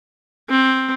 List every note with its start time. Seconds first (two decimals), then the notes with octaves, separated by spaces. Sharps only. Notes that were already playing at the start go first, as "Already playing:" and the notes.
0.50 C4